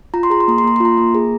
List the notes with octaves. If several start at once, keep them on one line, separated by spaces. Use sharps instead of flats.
F4 A#5
C6
G#4 A#5
C6
A#3 A#5
C6
A#3 A#5
C6
F4 A#5
A#3
G#4